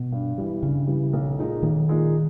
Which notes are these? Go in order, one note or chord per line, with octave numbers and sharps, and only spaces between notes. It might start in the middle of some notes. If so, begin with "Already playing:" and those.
Already playing: B2
G2
E3 G3
G2 C#3
E3 G3
B1
A#2 G#3 D#4
B1 D#3
A#2 G#3 D#4